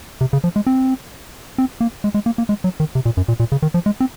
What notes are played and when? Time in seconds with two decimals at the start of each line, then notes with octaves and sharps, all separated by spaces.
0.21 C3
0.33 C#3
0.44 F3
0.56 G#3
0.67 C4
1.58 C4
1.81 A#3
2.04 G#3
2.14 G#3
2.26 A#3
2.38 A#3
2.49 G#3
2.64 F#3
2.80 D#3
2.95 C3
3.05 A#2
3.17 F#2
3.28 A#2
3.40 A#2
3.52 C#3
3.62 D#3
3.74 F3
3.86 G#3
4.00 C4